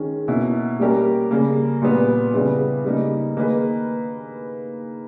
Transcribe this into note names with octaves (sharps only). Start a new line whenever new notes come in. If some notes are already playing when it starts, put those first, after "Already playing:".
Already playing: D#3 G#3 C#4
B2 A#3 C#4 E4
G3 A#3 C#4 G4 A#4
C#3 G3 A#3
A#2 G3 B3
C#3 G3 B3 E4 G4
C#3 G3 A#3 D#4
D#3 A#3 D#4 G#4 B4